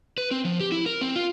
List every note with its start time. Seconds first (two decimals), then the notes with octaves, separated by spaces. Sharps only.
0.18 B4
0.31 C4
0.45 F3
0.60 G4
0.72 E4
0.86 A#4
1.01 C4
1.16 F4